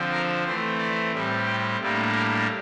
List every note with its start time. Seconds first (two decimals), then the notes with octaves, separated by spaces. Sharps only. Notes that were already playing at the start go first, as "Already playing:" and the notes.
Already playing: D3 F3 C4
0.11 A#4
0.45 E3 A3 C4 C5
0.79 D5
1.12 A2 G3 C4
1.46 G5
1.80 A2 G3 A#3 D4
2.13 A#4